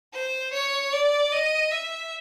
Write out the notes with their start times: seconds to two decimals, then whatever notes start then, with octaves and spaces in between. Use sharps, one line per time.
0.14 C5
0.53 C#5
0.93 D5
1.32 D#5
1.71 E5